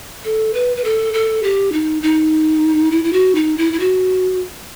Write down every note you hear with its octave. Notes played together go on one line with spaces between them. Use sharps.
A4
B4
B4
A4
A4
G4
D#4
D#4
E4
E4
F#4
D#4
E4
E4
F#4